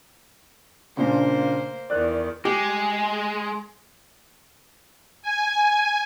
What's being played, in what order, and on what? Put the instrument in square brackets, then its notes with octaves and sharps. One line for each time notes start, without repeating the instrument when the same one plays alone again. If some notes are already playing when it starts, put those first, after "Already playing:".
[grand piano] G2 A#2 C#3 [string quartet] A#3 C5
[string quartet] E2 D#3 [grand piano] D5 F#6
[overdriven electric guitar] G#3 [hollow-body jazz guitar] G4
[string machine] G#5